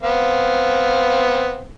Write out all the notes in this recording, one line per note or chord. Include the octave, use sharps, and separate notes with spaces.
B3 C4 F5